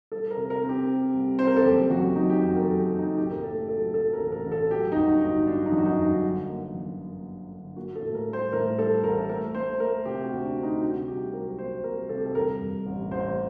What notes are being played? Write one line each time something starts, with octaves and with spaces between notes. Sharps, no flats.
G3 A4
A#4
C3
A#4
C4
G4
C4
C2
C4 C5
A#4
A4
F#1 G4
F#2 F#4
F#2 D#4
G4
F#1 F#4
A#4
A4
F#1
G4
F#1
D#4
A1 G4
A#4
A3 A4
F#3 A4
F#3 A4
A#4
A1
A#4
A1
A4
F#3 G4
D#4
G1 F#4
G1 D#4
F#3 D4
D#4
F#2
F#4
D#4
G1
D3
A#3
F#2
A#3
D3
D3
A#3 F#4
A4
A2
A#4
G3
C5
A2 A#4
G3 A4
A1 A#4
A3 A#4
A3 C5
A3 A#4
C3 G4
F#4
D2
D4
D2
D#4
C3 F#4
C2 G4
F#3 A#4
A#3 C5
C2 A#4
C3 A4
G4
A4
G2 A#4
G2
A1
A1 C5